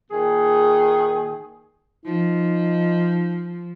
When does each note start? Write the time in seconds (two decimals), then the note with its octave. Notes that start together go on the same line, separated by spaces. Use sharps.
0.11 A#2 D#3 G#4
2.05 F3 D#4